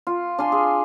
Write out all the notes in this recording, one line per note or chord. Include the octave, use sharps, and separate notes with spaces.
F4
D4 F5 G#5 C6
G#4